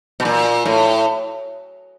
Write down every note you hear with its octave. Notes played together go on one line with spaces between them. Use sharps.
B2
A#2
A2